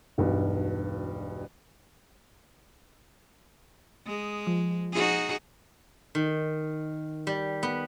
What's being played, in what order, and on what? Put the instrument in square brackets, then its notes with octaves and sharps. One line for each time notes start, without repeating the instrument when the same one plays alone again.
[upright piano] E1 B1 G2
[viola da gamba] G#3 [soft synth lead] D#6
[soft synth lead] F3
[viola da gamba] D#4 F#4 G#4
[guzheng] D#3
G3
B3